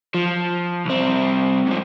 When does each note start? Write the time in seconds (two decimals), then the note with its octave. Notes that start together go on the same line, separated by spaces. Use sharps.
0.14 F3
0.85 C2 C4
1.67 G#2 F3